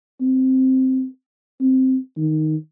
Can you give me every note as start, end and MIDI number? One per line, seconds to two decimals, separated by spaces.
0.21 1.05 60
1.61 1.97 60
2.17 2.56 51